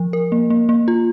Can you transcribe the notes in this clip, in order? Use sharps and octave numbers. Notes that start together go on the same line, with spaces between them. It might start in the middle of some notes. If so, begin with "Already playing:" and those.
Already playing: F3
A#4
A#3
A#3
A#3
F4